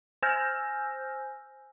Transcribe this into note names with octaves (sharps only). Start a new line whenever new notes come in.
C5 G#5 E6 F6 G6 A#6